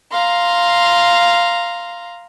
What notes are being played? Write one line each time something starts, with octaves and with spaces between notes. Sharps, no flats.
F5 A#5 C6